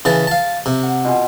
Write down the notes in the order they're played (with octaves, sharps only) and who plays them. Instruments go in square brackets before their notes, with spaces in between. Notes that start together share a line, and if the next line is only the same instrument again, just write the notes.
[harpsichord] C#3 E3 A5
F5 A5
C3
[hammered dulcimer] F#5
B2 F4 G#5